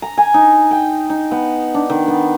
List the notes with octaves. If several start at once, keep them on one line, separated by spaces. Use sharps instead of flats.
A#5
G#5
D#4
G5
D#4
B3
D4
D#3
B3